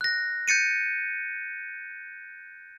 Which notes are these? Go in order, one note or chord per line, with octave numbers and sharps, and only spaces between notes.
F#6 A#6
G6 A6 C#7 D#7